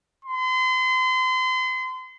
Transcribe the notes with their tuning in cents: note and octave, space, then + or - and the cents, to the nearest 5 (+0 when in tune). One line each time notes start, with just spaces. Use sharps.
C6 -35